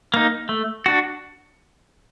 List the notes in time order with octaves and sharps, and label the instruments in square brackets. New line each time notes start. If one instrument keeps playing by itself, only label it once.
[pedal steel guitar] A#3 D#4
A3
D4 F#4